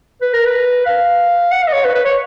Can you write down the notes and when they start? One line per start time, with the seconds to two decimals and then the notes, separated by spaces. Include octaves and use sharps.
0.21 B4
0.33 A#4
0.46 B4
0.86 F5
1.52 F#5
1.62 F5
1.67 D#5
1.73 C#5
1.84 B4
1.95 B4
2.05 C#5